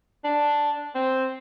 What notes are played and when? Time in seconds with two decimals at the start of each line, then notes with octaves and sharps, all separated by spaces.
0.25 D4
0.95 C4